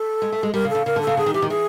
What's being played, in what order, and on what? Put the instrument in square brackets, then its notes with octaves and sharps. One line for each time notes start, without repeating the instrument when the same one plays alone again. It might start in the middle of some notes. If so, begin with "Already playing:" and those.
Already playing: [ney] A4
[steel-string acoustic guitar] G#3
A3
G#3
[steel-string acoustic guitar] G3 [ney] A#4
[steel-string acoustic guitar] C#3
[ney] A4
[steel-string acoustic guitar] C#3
[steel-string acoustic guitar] C#3 [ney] A#4
[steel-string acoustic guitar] D3
[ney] A4
[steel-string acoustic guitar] C#3
[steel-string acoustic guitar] D3 [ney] G#4
[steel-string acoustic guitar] D#3
[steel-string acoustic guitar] E3 [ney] G4
[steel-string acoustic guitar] D#3
[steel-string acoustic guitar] E3 [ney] G#4